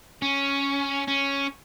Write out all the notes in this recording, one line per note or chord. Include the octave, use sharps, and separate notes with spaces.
C#4
C#4